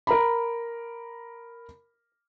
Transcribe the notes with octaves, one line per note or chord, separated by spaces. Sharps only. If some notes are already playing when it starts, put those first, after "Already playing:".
A#4 A#5 B5